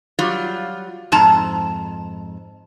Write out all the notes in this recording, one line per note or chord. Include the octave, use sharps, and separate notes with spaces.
F#3 G3 F4
F2 G#2 A5 A#5